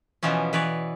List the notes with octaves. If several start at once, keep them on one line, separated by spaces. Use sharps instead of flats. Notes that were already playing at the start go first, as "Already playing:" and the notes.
B2 E3 F3 B3 C#4
E3 B4 C#5 D5